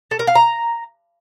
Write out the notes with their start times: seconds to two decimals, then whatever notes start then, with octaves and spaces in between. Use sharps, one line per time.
0.11 A4
0.19 A#4
0.27 F5
0.35 A#5